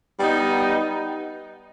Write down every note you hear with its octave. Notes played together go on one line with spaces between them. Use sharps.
G3 B3 D#4